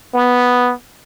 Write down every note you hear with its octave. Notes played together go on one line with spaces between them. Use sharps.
B3